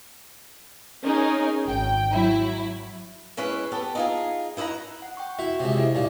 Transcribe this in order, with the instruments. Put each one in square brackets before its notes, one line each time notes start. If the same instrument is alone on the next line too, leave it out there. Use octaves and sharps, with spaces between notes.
[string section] C#4 D#4 G#4 A#4
G#1 G5
F#3 E4
[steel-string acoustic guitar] G#3 C#4 E4 B4
B3 G4 A4
D#4 F4 G#4
D#4 E4 C5 F#5 A#5
[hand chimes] F#5
G5 C#6
[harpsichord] E4 [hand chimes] F#4 E5
[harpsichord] C#2 C3
[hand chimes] E4 G4 D#5
[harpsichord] B1 A#2